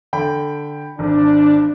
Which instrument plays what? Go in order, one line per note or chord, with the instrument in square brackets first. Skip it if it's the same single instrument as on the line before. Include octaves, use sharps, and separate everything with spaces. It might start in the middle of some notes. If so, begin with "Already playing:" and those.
[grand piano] D3 G5 B5
[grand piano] G#1 [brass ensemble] D4